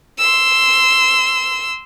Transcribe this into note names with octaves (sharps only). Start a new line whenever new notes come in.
C6 E6